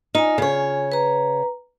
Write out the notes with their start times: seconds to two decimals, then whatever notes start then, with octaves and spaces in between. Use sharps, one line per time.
0.15 D#4 F4 G#5
0.38 C#3 C#5
0.92 B4 A#5